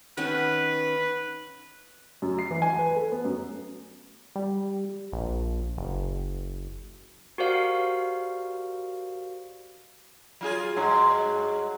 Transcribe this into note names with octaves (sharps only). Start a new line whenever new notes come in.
D#3 B3 C#4 B4
F#2
C7
E3
G#5
B4
A4
B3
F#2
G3
A#1
F#1
F#4 G4 A#4 C5 D5 F5
F#3 F4 G#4
G2 F#3 G#3 C6